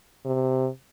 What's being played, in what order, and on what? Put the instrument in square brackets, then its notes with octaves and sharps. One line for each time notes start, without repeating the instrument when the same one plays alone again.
[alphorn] C3